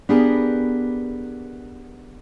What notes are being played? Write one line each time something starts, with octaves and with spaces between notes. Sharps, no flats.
B3 D4 G4 G#4 A#4 B4